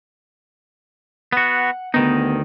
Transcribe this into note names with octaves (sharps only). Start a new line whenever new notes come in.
B3 F#4 F#5
D2 D#3 B3 D#4